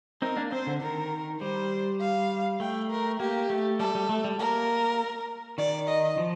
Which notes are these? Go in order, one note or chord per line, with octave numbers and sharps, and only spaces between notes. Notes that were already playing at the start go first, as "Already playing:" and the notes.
C4 D#4 A#4
A#3 D4
C4 C5
D3
D#3 A#4
G3 C5
F5
A3 G5
A#4
A#3 G4
A3
G3 A4
G3
A3
G3
A#3 A#4
D#3 D5
D#5
F3